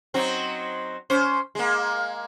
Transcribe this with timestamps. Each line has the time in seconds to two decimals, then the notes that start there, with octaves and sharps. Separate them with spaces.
0.14 F#3 C4 D#4
1.10 C#4 C5
1.55 G#3 A#3